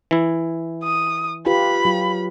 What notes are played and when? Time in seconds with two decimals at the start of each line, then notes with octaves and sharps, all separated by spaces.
0.11 E3 E4
0.84 D#6
1.46 F4 G4 B4 B5
1.85 F#3 F4